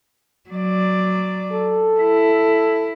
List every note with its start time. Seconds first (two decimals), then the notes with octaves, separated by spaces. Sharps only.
0.50 F#3 D5
1.52 A4
2.00 E4